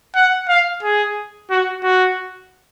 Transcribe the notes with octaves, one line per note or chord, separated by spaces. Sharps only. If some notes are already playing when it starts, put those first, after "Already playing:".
F#5
F5
G#4
F#4
F#4